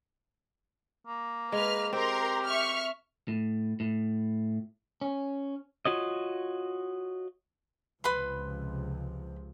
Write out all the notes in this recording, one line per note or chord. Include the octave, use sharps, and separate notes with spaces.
A#3
G#3 B4 F6
C4 G4 A#4 A#5 C6
E5 C#6 F6
A2
A2
C#4
F4 F#4 C#5 D#5
C#2 C3 F3 B4 B5 C6